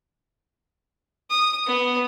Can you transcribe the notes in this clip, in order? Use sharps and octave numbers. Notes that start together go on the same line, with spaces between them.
D#6
B3